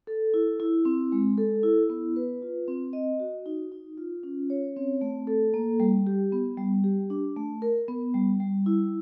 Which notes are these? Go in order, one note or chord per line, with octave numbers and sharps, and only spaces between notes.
A4
E4
E4
C4
G#3
A4
E4
B3
B4
F4
C4
D#5
F#4
D#4
D#4
F4
C#4
C#5
C4
A3
A4
A#3
G3
G4
B3
G3
G4
D4
A3
A#4
B3
G3
G3
E4